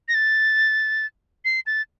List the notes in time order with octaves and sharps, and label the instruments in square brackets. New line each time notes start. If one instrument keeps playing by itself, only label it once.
[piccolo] A#6
A6
C7
A6